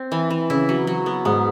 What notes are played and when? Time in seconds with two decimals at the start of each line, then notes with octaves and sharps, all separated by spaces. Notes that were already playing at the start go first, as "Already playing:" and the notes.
Already playing: C4
0.12 E3
0.30 E3
0.50 C#3 E4
0.69 F#3
0.87 F#3
1.06 B3
1.25 G#2 B3